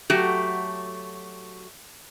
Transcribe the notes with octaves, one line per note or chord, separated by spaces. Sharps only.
F#3 A3 F#4 G4